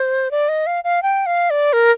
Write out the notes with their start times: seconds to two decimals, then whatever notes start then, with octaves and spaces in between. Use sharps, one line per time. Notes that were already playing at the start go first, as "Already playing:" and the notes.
Already playing: C5
0.31 D5
0.49 D#5
0.67 F5
0.84 F5
1.03 G5
1.26 F5
1.50 D5
1.73 A#4